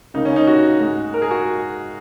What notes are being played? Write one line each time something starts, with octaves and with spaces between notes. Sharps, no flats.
C#2 C#3 A#3 D#4
C#4
D#4
F#4
G#2 G#3
A#4
G#4
F#4